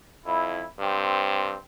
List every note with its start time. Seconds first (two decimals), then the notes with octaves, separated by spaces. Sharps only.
0.26 F2 E4
0.79 G2 C4